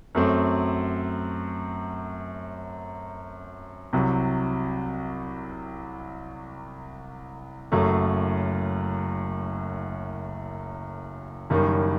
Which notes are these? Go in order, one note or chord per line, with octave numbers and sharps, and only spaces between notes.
F#2 F#3 A3 C4
C2 C3 F#3
F#1 F#2 F#3 A3
F#1 F#2 D#3 G3